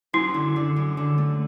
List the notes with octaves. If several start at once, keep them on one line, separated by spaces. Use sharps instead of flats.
F#2 E4
D3
D3
F#2
D3
A3